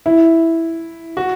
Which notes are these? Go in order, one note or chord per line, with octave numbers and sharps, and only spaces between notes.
E4
F#4